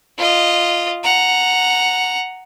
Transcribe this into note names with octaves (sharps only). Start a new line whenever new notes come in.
F4 D#5
F#5 A#5